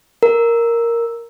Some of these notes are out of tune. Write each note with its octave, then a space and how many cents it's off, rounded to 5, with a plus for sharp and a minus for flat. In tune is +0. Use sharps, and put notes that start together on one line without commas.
A#4 +0